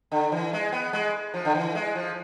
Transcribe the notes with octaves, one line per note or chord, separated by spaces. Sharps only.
D3
E3
G#3
B3
G#3
F3
D3
E3
G#3
F3